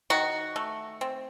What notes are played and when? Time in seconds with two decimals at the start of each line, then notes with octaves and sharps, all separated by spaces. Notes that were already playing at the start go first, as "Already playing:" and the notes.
0.10 D#3 F#4
0.56 A3
1.01 C4